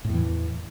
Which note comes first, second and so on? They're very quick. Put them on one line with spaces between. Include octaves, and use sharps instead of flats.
A2 E2 E3